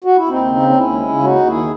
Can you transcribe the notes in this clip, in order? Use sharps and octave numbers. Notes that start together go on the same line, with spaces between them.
F#4
E4
D#2 C4 D#4
C#3
D#2
D#4
D#2 C#4 E4
G#3
C#3
D#2 D#4 F#4
D#2
E4 G#4
D#3